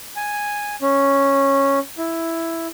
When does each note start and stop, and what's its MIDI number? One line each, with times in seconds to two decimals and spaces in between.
0.16 0.75 80
0.81 1.79 61
1.98 2.67 64